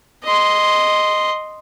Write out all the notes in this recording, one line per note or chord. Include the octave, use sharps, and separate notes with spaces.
D#5 C6